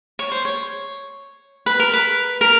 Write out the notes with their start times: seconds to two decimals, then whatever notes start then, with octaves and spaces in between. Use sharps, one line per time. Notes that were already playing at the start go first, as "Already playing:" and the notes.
0.19 C#5
0.32 C5
0.45 C#5
1.66 B4
1.80 A#4
1.94 B4
2.41 A#4